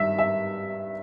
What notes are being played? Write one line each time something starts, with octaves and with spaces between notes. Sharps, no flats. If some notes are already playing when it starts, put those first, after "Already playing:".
Already playing: G2 D#3 E5
E5